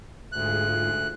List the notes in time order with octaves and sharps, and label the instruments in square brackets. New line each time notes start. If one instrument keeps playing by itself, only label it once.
[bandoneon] D2 F#6 [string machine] G#2 F4 G#4